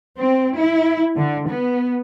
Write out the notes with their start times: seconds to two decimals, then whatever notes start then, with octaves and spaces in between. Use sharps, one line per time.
0.17 C4
0.56 E4
1.17 D3
1.50 B3